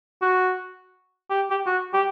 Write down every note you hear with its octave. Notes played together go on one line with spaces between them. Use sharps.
F#4
G4
G4
F#4
G4